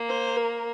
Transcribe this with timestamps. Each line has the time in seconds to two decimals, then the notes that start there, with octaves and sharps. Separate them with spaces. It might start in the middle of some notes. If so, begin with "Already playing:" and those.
Already playing: A#3
0.09 C5
0.36 A#4